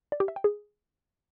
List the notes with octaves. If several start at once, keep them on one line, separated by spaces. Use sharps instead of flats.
D5
G4
E5
G5
G#4